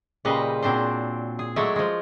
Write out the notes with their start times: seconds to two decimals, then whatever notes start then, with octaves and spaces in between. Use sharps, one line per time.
0.25 A#2 C#3 G3 B4 C5 D#5
0.62 A#2 F#3 C4 D4 C5
1.39 G#4
1.56 F#3 G#3 A3 C#5 D5 E5
1.76 F3 G#3